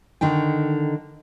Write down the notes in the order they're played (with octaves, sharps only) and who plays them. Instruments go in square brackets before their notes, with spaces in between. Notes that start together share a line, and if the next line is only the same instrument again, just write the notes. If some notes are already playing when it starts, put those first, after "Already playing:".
[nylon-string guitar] D3 D#3 D#4 G5